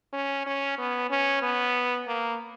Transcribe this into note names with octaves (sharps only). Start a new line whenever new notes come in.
C#4
C#4
B3
C#4
B3
A#3